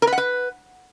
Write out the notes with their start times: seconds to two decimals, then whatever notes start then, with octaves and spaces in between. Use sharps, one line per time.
0.02 A#4
0.07 B4
0.12 F#5
0.18 B4